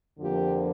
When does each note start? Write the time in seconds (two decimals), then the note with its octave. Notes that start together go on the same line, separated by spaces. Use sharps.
0.19 F2 D3 F3 A#3 G4